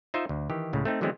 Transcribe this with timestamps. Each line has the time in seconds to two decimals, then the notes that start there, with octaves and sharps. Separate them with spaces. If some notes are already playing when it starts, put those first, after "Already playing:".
0.14 D#4 F4 C5 D#5 E5
0.29 D2
0.50 D#3 E3 G4
0.73 C#2 A2 C#3
0.85 A3 C4 D#4
1.01 D3 E3 F#3 G#3 B3 C4